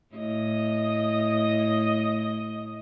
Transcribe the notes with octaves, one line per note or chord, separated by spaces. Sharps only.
A2 D#5